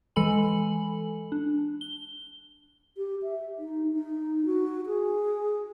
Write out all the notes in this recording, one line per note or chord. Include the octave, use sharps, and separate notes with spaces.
E3 G#3 A4 G#5 B5 F#7
D4
G7
G4
E5
D#4
D#4
F#4
G#4